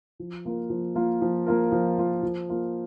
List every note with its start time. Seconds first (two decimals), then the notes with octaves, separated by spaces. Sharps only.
0.19 F3
0.45 A#3 F4 A#4
0.70 F3
0.95 A#3 F4 A#4
1.22 F3
1.46 A#3 F4 A#4
1.72 F3
1.98 A#3 F4 A#4
2.23 F3
2.49 A#3 F4 A#4